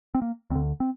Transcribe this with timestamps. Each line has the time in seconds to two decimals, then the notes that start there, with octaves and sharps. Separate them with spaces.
0.15 C4
0.22 A#3
0.50 D2 C4
0.55 D3
0.80 C4